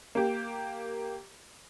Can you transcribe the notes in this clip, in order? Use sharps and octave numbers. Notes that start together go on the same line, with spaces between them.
A#3 G4